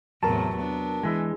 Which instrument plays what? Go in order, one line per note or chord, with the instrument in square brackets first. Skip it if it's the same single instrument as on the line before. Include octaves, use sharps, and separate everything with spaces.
[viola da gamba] E2 A2 C3 [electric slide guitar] F#3 [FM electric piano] A#4 A5
[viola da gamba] B3 D4
[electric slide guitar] E3 G#3